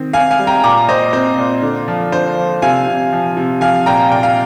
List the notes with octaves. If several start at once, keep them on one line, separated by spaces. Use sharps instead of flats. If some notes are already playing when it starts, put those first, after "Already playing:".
Already playing: D#3 C4
C4 F5 G#5
F5 G#5
G3
G5 A#5
A#2 A#5 D6
A#2 C5 D#5
C4 C5
A#2
D3
F3
D3 C5
F3
C3 F5 G#5
C3
F3
C3
F3 F5 G#5
A#2 G5 A#5
A#2 G5
F5